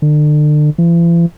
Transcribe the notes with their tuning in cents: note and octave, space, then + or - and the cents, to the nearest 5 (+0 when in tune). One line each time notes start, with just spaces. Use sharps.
D3 +35
E3 +45